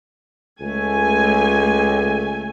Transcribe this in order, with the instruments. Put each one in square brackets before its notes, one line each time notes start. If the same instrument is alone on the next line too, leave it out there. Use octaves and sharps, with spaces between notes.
[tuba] C#2 [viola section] A3 G#5